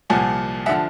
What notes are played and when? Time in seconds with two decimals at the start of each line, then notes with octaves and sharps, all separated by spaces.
0.10 C2 A#2 F3 F#5 G#5
0.66 E5 F#5
0.69 D3 F3